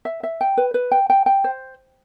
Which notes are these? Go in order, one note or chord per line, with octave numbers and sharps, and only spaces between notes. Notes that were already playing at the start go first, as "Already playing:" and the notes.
E5
E5
G5
B4
B4
G5
G5
G5
C5